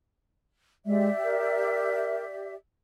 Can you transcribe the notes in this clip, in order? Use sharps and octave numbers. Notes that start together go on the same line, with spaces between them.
G#3 G4 D5 E5
A#4